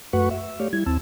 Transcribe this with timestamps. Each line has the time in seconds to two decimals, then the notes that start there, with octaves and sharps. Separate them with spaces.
0.13 F#2 A3 F#4 B4 F#5 C#6
0.31 E5
0.60 A3 G4 C#5 D5 F5
0.73 G3 E4 G#6
0.86 D#2 C4 A5 E6